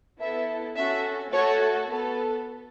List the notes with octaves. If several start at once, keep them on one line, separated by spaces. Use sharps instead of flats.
B3 E4 A4 E5
C#4 F#4 A4 E5
A3 F#4 A4 C#5
B3 A4